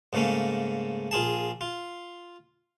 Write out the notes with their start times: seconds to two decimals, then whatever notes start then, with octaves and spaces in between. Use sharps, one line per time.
0.13 G#2 C#3 A3 A#3 C#4
1.11 A#1 F4 G#4 A5
1.61 F4